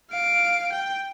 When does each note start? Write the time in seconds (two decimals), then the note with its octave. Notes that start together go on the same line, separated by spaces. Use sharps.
0.10 F5 D7
0.72 G5